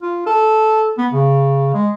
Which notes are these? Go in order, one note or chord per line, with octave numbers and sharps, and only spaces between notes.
F4
A4
B3
C#3
G#3